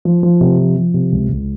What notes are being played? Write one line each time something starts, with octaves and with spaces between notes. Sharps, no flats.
F3
F3
C3
F3
F3
C3
C#2
C#2